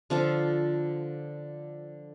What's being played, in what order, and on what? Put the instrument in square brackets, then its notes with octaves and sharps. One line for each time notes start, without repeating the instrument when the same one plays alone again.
[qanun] D3 F3 F4 A4